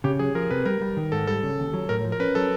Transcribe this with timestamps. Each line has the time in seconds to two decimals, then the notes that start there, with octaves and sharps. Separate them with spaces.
0.04 C#3 G4
0.19 F#3 G#4
0.35 F3 A#4
0.50 C3 B4
0.66 G3 A#4
0.81 G3
0.97 D#3
1.12 G#2 A4
1.27 G3 A4
1.43 C#3
1.59 D#2
1.74 F#3
1.89 A2 A#4
2.05 F3
2.12 A#4
2.20 C#4 B4
2.35 F#3 A4